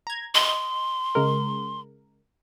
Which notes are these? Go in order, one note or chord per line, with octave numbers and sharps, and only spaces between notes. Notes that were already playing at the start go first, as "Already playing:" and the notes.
A#5 G#6
D#5 C6
C#3 G#3 A#4